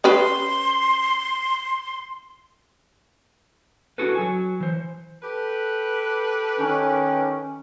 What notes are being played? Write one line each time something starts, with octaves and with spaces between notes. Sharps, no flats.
C#4 G4 B4 C6
C#4 E4 F#4 G#4 A4 B4
F#3 G#5
E3 C5
G4 A4 B4
D#3 C#4